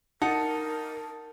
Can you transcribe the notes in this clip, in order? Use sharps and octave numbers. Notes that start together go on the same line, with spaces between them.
D#4 A#4 F#5 A5